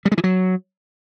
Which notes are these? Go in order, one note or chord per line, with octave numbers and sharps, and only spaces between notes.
G3
G#3
E3
F#3